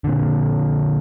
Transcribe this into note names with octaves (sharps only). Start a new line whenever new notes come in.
A#2 D3